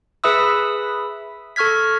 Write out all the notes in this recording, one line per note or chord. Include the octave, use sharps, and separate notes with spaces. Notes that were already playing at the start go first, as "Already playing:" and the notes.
G#4 B4 E5 B5 D#6 E6
A4 C#6 F6 G#6 B6